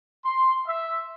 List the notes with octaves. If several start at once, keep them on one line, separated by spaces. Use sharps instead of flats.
C6
E5